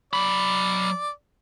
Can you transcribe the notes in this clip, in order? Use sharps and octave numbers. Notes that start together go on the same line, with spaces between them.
F#3 D5 B5